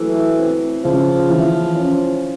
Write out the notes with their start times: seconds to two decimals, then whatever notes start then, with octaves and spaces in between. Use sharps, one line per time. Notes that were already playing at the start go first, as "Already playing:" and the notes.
Already playing: E3 F#3 A3
0.38 C4
0.84 C#3 F3
1.30 E3
1.76 C#4